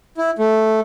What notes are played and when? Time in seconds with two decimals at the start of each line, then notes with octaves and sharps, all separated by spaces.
0.18 E4
0.39 A3